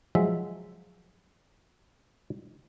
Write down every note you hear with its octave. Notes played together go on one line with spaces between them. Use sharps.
F3 F#3 G#3 E5